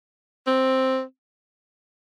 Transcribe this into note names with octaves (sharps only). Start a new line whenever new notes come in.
C4